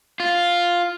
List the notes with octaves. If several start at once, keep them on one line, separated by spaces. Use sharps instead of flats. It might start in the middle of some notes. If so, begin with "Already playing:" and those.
F4